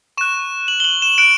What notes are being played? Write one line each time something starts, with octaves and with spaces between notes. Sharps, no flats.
C#6 F#6 E7
F#7
G7
F#7
E7
F#6 D7